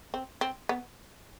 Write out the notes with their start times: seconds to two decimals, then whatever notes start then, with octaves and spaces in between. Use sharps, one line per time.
0.14 C4
0.41 C4
0.69 B3